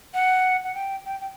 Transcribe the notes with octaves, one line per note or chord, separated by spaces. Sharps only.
F#5
F#5
G5
G5
G5